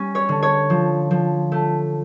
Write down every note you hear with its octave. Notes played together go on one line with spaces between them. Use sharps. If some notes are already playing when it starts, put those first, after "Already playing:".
Already playing: G3 C#4
C#5
D3
C#5
F3
F3
A3